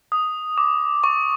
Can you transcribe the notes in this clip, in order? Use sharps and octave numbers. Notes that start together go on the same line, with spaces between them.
D#6
D6
C#6